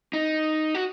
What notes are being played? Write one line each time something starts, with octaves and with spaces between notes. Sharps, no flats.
D#4
F#4